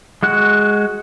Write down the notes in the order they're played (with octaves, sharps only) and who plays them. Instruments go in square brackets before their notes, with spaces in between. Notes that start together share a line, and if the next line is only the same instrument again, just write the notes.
[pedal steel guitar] G#3 F#4 F#6